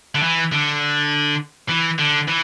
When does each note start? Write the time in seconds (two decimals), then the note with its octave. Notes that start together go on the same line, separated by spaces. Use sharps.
0.15 D3
0.23 E3
0.52 D3
1.69 E3
1.98 D3
2.28 E3